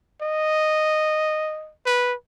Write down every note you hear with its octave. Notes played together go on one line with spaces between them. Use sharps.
D#5
B4